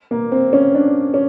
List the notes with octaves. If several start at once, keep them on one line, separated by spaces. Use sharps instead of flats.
A#3
C4
C#4
D4
C#4